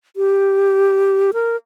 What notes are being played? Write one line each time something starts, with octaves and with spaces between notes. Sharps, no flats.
G4
A#4